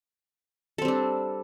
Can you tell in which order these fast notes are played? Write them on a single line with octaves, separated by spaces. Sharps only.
A4 C4 G3 D4